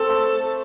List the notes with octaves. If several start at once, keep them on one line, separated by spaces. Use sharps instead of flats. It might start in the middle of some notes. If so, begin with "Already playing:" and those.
Already playing: C4 A4
A3